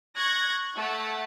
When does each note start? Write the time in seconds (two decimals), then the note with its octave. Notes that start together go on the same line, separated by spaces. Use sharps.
0.16 C#6 F#6 G#6 A#6
0.75 A3 F#5 A5